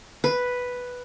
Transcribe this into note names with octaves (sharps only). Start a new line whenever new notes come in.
B4